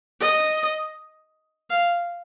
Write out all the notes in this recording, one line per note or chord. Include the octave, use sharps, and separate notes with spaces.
D#5
F5